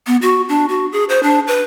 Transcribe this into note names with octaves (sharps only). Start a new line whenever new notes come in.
B3
F#4
D4
F#4
G#4
C5
D4
B4